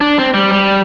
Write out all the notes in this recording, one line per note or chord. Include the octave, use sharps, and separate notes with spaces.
D4
C4
G3
G3